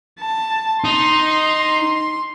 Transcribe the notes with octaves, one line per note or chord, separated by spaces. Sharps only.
A5
D#4 C6